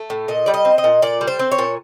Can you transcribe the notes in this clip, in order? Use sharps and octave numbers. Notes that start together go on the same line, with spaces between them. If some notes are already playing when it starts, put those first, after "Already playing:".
Already playing: A3
A2
A#2 D#5
G3 D5
D#5
C4
D#5
A#2
A#2 D5
G3
C5
C4
C#5
A#2